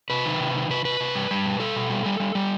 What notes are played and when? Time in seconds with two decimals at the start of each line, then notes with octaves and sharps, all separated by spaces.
0.10 C3 B4
0.25 D#3
0.40 C3
0.55 D#3
0.70 C3 B4
0.85 C3 B4
1.00 C3
1.15 G3
1.31 G3
1.45 B2
1.60 G3 A4
1.76 B2
1.90 G3
2.06 G3
2.20 G3
2.35 G3